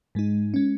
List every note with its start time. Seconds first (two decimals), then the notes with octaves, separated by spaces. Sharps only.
0.15 G#2 G#3 D#4
0.54 G#3 C#4